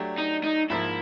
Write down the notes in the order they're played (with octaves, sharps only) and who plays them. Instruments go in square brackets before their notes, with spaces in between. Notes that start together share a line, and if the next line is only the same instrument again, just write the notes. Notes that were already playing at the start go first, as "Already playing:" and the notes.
Already playing: [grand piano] F#3 A3 D4 G4
[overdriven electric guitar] D#4
D#4
[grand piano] G#2 F3 A#3 [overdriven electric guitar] E4